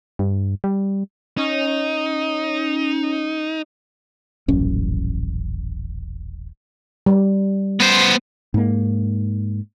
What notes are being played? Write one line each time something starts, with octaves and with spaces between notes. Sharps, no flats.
G2
G3
C#4 D#4
D#1 A1 F#2 C#4
G3
B3 C5
G#2 A#3